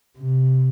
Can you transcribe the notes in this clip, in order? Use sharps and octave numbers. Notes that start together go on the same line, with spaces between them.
C3